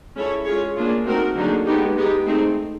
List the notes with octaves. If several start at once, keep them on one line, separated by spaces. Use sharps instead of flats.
G#3 C#4 E4 A4 C#5
G#3 C#4 F4 G#4 C#5
A#3 D4 F4 G#4
A3 C4 D#4 F#4 A#4
D3 F#3 A#3 D#4 G#4
G#3 B3 D#4 G4
G#3 B3 D#4 G4
A3 C4 D#4 G#4